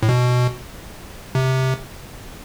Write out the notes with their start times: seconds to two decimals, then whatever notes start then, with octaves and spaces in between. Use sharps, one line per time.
0.03 A2
0.09 B2
1.35 C3